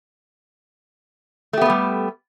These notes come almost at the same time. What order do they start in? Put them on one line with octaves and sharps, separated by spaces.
A3 G4 B3 A4 G3